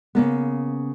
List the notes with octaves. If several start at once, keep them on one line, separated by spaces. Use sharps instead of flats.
C#3 A#3 B3